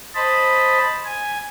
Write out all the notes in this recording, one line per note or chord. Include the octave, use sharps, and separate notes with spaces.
C5 D#5 A5 B5
G#5